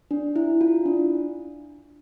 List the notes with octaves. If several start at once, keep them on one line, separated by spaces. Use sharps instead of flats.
D4
E4
F4
D4